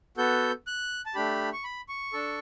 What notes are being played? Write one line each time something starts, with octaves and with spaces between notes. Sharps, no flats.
B3 F#4 A4 G6
F#6
A5
A3 D4 G4 B5
C#6
B5
C#6
D4 A4